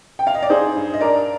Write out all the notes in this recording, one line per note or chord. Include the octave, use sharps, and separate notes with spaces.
G5
F5
D#5
D5
D#4 G#4 C5
G2
D#5
D4 A#4 D5